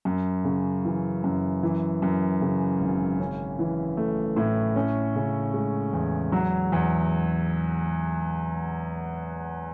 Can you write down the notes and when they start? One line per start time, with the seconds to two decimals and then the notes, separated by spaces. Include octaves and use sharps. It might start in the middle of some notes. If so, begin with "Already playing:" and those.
0.05 F#2
0.44 C#3
0.85 E3
1.24 F#2
1.63 E3
2.02 F#2
2.41 C#3
2.80 G#1
3.19 C#4
3.59 E3
3.97 A3
4.36 A2
4.76 C#4
5.16 C#3
5.54 G#3
5.93 E2
6.32 F#3
6.72 E2